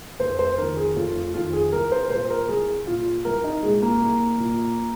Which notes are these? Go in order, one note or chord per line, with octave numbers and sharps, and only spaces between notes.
F1 C5
C5
F2 D#3 A#4
G#4
F1 F4
F4
F2 D#3 F4
G#4
C2 A#4
C5
A#2 C5
A#4
C2 G#4
A#2 F4
C2 A#4
D#4
A#2 G#3
A#3
C2
A#2